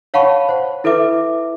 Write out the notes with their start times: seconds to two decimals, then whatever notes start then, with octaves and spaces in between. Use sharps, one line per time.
0.14 C#5 F5 F#5 A5 B5 C#6
0.49 C5 F#5
0.84 E4 A4 B4 E5 D6